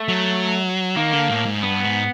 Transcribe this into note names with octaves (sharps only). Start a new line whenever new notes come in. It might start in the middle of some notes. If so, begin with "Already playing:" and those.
Already playing: A3
F#3
D#3 A#3
D3
A2
G#2
G2 B3
G#2